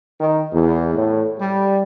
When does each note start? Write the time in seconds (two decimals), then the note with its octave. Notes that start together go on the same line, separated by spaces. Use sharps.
0.18 D#3
0.51 E2
0.94 A2
1.38 G3